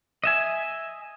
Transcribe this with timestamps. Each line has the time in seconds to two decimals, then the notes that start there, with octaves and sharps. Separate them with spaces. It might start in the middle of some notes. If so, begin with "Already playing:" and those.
0.24 D#5 E5 G#5